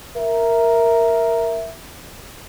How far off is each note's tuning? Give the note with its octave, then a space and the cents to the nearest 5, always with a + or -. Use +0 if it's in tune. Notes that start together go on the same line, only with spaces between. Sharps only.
A#4 +0 E5 +0